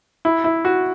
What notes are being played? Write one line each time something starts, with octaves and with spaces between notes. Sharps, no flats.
E4
E4
F#4